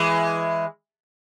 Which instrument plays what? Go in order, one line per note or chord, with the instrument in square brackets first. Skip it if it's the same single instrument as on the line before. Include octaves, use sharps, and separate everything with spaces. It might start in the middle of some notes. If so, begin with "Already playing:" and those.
Already playing: [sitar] E3 G#3